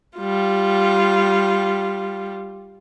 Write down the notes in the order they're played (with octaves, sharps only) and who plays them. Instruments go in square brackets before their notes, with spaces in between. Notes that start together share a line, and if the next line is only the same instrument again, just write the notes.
[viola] G3 F4